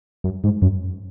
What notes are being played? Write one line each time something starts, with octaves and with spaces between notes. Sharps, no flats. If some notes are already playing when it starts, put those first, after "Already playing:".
F#2
G#2
F#2